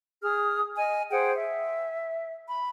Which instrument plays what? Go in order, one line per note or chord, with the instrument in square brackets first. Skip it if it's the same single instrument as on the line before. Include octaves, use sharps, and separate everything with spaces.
[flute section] G#4 D#6 F6
D#5 G#5
G#4 C5 F#5 G5
E5
B5